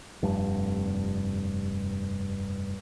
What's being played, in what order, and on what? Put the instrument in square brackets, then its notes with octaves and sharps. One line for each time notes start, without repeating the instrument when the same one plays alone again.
[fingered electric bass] F1 G2